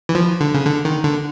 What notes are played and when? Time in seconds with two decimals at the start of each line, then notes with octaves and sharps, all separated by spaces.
0.09 E3
0.15 F3
0.41 D3
0.54 C#3
0.66 D3
0.85 D#3
1.04 D3